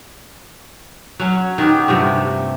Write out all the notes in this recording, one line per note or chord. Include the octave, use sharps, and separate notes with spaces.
F#3 C#4
D#3 B3 F#4 G4
G2 C3 F3 A3